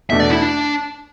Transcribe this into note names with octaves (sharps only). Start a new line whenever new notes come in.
E2 B2 A3 D4 E5
D5
E4
D4